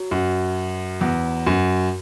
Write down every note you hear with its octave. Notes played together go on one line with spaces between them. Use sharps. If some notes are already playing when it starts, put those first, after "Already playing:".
Already playing: F#3
F#2
E2
F#2